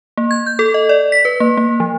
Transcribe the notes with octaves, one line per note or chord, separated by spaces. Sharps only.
A#3
G#6
G6
A4
D#5
D5
B6
B4
A#3
A#3
F3